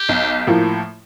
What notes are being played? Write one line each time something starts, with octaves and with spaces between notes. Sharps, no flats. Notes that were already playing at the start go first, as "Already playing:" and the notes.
Already playing: G4
B1
A2 F3 A#3